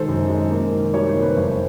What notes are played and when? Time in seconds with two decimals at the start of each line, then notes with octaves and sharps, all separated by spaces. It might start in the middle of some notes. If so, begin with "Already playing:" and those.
Already playing: D#3 G#3 A4 C5
0.08 F#2
0.29 G#3
0.51 A#3
0.72 D#3
0.94 G3 C#5
1.09 C5
1.15 A#3
1.22 B4
1.37 F1 C5